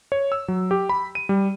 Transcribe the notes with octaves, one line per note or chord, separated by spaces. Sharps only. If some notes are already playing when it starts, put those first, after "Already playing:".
C#5
E6
F#3
G4
B5
D#7
G3